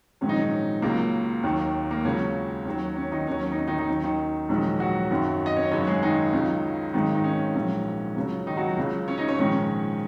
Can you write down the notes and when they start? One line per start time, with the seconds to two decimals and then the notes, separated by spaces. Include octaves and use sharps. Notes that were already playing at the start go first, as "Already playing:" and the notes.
0.21 A#1 G#2 D#3 F#3 C#4
0.29 D#4
0.37 C#4
0.82 C#2 C#3 F#3 A#3
1.43 D#2 D#3 F#3
1.91 A#3
2.05 C#2 C#3 F#3 C#4
2.65 D#2 D#3 F#3
2.96 C#4
3.12 D#3 D#4
3.27 D#2 D#3 F#3 C#4
3.42 C#4
3.52 D#4
3.58 C#4
3.68 D#3 D#4
3.78 D#3 D#4
3.88 D#2 D#3 F#3 C#4
4.04 D#3 D#4
4.49 A#1 G#2 D#3 F#3
4.80 F#3 F#4
5.11 G#1 F#2 D#3 F#3
5.46 D#5
5.56 C#4 C#5
5.71 G#1 F#2 C#3 F#3 C#4 C#5
5.87 G#3 G#4
6.03 D#3 D#4
6.33 C#2 C#3 F#3
6.94 G#1 G#2 D#3 F#3 D#4
7.14 D#3 D#4
7.24 C#4
7.55 A#1 G#2 D#3 F#3
8.16 C#2 C#3 F#3
8.47 D#3 D#4
8.57 F#3 F#4
8.77 C#2 C#3 F#3
9.08 C#4 C#5
9.18 D#4 D#5
9.28 C#4 C#5
9.39 A#1 G#2 D#3 C#4 C#5